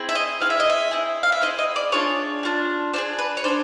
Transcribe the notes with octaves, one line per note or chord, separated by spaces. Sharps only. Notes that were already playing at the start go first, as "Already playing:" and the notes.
Already playing: C4 E4 G#4
E5
D#5
C4 E4 G#4 F5
E5
D#5
E5
C4 E4 G#4
F5
E5
C4 E4 G#4 D#5
D#5
D5
D4 F4 G#4 C#5
D4 F4 G#4
D4 F4 G#4 C5
B4
C#5
D4 F4 G#4 C5